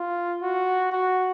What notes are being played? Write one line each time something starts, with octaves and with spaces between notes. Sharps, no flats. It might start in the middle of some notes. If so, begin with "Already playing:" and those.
Already playing: F4
F#4
F#4